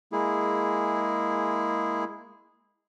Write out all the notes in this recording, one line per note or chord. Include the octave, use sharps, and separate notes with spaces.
G#3 A#3 E4 G#4